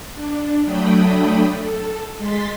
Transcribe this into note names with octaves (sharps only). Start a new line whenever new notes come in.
D4
F#3 A3 D4 G5 B5 D#6
A4
G#3 C6 A6 B6